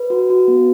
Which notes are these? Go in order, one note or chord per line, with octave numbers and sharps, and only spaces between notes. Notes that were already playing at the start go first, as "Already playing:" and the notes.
Already playing: B4
F#4
F#4
B3